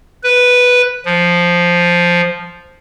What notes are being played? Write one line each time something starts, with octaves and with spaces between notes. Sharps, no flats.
B4
F3